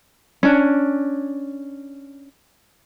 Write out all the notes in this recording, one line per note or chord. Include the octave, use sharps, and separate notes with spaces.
C#4 D4